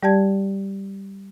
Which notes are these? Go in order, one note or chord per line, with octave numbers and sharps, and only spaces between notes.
G3 G4 D5 A5 G#6